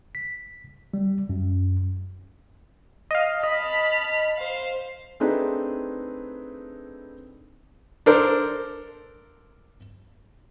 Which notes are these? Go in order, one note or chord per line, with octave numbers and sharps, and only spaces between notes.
B6
G3
F#2
D#5 F5
D#5 A5 B5 F6
C5 F5
A3 C4 D4 D#4 G#4 B4
D4 A4 A#4 C5